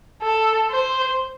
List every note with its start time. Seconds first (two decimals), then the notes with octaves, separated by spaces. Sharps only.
0.22 A4
0.70 C5